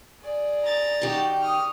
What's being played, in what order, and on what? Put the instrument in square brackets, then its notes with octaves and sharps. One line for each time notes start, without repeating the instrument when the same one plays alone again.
[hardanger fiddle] G#4 D5
[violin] A#5 A6
[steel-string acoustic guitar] D#3 G4 [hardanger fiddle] D#4 F#4
[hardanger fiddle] C#6 [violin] D#6 F6